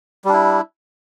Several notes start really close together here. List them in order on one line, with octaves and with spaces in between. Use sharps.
G3 D4 E4